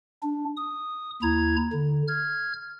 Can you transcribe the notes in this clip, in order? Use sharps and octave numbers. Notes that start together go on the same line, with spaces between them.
D4
D#6
D#2 E4 A#5 G#6
D3
F6 G#6